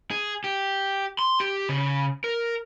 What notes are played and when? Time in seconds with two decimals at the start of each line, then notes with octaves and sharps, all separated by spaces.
0.11 G#4
0.44 G4
1.19 C6
1.40 G4
1.69 C#3
2.24 A#4